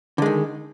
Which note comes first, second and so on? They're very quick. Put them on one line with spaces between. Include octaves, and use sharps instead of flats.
D3 G#3 D#3